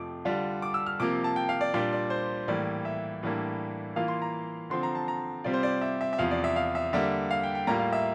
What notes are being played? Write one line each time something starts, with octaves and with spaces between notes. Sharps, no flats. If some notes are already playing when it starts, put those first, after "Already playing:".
Already playing: F2 C3 F3 A3 D6
D3 G3 D4 F4
D6
E6
F6
C3 F3 A#3 D6
A5
G5
F5
D5
A#2 G3 D4 F4 D5
D5
C5
A2 E3 G3 A#3 D5
E5
A2 E3 G3 A#3 D4
E3 A#3 F4 F5
C6
A#5
D3 F3 C4 C6
A#5
A5
A#5
C3 G3 C4 F4 D5
C5
D5
E5
E5
E5
E2 C3 F3 F5
D5
E5
F5
E5
D3 G3 A#3 E5
F5
G5
G5
A2 G3 A#3 F4 A#5
F5
E5